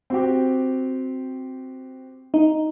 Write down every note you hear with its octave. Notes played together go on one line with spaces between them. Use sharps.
C4 F#4 G4
D#4